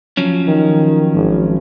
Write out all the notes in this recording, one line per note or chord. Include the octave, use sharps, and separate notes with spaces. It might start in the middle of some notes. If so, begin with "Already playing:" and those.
F3 F#3 C#4
D#3
G#1